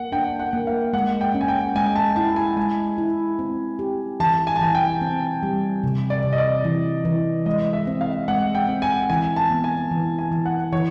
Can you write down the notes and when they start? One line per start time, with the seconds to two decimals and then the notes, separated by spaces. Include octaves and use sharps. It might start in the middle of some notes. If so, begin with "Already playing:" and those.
Already playing: A#3 F#5
0.12 D4 G5
0.39 F#5
0.53 A#3
0.67 F5
0.93 G#3 F#5
1.21 G5
1.34 C#4
1.41 G#5
1.48 G5
1.75 G#3 G#5
1.96 A5
2.16 E4 A5
2.36 G#5
2.56 G#3 G#5
2.98 E4
3.39 C4
3.79 G4
4.20 E3 A5
4.47 G#5
4.56 A5
4.61 E3 G#5
4.75 G5
5.01 C4
5.43 G3
5.83 C3
6.10 D5
6.24 C3
6.33 D#5
6.38 D5
6.64 E3
7.05 E3
7.46 G#3 D#5
7.73 E5
7.87 C4
8.01 F5
8.28 G#3 F#5
8.55 G5
8.69 C4
8.82 G#5
9.10 E3 G#5
9.36 A5
9.50 B3
9.64 G#5
9.91 E3
10.18 G#5
10.31 E3
10.46 F#5
10.72 E3 C#5